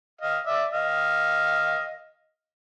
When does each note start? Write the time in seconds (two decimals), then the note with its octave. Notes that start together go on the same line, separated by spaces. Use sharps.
0.21 D#5 F5
0.46 D5 E5
0.72 D#5 F5